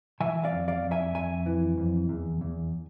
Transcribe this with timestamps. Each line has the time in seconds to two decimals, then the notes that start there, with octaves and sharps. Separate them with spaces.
0.20 E3 E5 G#5
0.44 D5 F5
0.52 F2
0.68 D5 F5
0.84 F2
0.91 E5 G#5
1.15 F2 E5 G#5
1.46 E3
1.78 F2
2.09 E2
2.41 E2